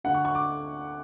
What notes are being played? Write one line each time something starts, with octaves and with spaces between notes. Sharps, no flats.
D2 D3 F#5
C#6
C#6
D6